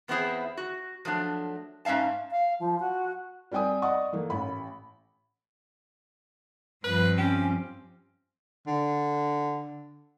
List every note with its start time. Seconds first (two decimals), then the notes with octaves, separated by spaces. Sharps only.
0.08 E2 B3 C4 E4 G#4 C5
0.57 F#4
1.05 F3 F#3 A3 D4
1.85 G#2 C#4 E5 F5 A5
2.31 F5
2.59 F3
2.80 F#4
3.52 G3 C4 D5 G5 G#5 D#6
3.82 D5 D#5 F#5 C#6 D#6
4.13 E3 A3 A#3
4.30 A1 B5
6.84 G2 F3 C4 B4
7.18 C#4 G4
8.67 D3